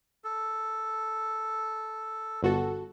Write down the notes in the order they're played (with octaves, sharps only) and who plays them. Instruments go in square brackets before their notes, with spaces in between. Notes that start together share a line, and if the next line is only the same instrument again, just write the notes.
[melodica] A4
[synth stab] G1 F#4 A4